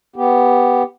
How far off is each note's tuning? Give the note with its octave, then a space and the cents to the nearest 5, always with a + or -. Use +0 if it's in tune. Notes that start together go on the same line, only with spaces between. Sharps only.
B3 +0 G4 +0